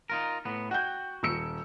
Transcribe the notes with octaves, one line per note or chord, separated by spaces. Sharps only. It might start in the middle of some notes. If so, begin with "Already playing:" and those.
D#4 F4 A#4
A2 B3
F#4 F#5 G5 G6
D#1 E6 C#7